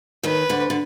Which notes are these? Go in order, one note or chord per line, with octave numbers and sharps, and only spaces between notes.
D#2 D#3 B4
D2 D3
D3